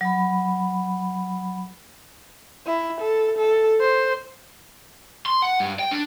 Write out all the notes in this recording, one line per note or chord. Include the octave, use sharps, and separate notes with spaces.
F#3 B5
E4
A4
A4
C5
C6
F#5
G2
G5
D4